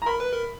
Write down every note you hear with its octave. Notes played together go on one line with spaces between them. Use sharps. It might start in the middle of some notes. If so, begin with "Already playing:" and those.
A#5
A#4 B5
B4
A#4